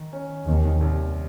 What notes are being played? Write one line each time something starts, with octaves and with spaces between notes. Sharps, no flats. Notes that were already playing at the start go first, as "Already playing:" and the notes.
Already playing: D#3
C#4
D#2 C3 D#3
C2